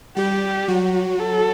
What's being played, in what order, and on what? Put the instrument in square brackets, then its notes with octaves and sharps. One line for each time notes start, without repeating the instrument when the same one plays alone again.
[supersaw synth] G3 [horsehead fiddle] G4
[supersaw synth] F#3 [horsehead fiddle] F#4
[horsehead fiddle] A4